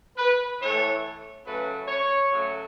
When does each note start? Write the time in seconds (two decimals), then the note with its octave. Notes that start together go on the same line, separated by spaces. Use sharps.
0.17 B4
0.60 A2 E3 A3 C#5
1.45 C#3 F#3 A3 B4
1.88 C#5
2.31 C#3 F#3 A3